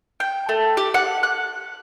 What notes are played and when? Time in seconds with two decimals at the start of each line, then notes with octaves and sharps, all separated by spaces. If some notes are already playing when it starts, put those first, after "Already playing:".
0.20 G5
0.49 A3
0.77 G4
0.94 F#5
1.23 F#6